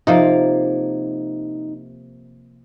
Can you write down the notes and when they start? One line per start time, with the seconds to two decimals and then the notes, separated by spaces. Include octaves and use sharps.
0.07 C3 F3 A#3 D#4